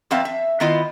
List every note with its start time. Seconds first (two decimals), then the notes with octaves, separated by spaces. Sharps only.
0.11 F2 B3 C4 E5 F5 A5
0.25 E5
0.60 D#3 B3 E4 F4 D#5